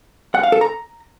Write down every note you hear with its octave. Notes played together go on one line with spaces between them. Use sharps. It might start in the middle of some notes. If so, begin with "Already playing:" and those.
F#5
F5
A4
A#5